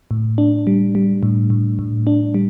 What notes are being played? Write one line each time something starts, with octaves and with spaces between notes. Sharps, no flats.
A2
D4
G3
G3
A2
A2
A2
D4
G3